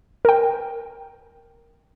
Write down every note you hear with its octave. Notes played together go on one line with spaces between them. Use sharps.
A#4 G5